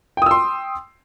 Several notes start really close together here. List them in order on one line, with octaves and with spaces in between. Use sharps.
G5 D#6 E6 C6